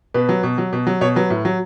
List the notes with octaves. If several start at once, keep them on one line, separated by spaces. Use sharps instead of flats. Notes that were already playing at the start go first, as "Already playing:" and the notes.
B2 B4
F#3
B2
F#3
B2
F#3
B2 C#5
F#3 B4
A2
F#3